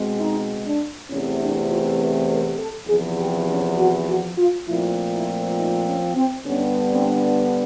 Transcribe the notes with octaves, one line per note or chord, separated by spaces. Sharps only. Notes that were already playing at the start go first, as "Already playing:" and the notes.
Already playing: B2 G#3 C4
D#4
D4
E2 C3 E3 A3 C4 C#4
D4
F4
B4
A#4
A4
E2 C3 F3 G#4
G4
C#4
F#4
F#4
F4
A#2 F3 A3 C4 E4
E4
D#4
C#4
C4
G2 D3 G3 B3 C#4
C4